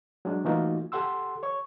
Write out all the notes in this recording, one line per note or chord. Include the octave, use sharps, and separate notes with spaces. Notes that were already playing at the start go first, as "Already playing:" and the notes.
F#3 G#3 D4
E3 A3 A#3 D#4 F4 F#4
G4 A4 F#5 C6 E6
C#5 C#6